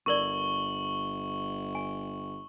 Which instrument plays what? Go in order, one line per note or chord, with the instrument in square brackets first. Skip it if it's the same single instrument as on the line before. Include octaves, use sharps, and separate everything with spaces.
[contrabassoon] G1 [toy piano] E4 A#4 D5 [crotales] C#6 F#7 G7
[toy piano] G#5